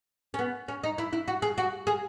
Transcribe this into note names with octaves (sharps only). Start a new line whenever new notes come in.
C#4
B3
C#4
D#4
E4
E4
F#4
G#4
F#4
G#4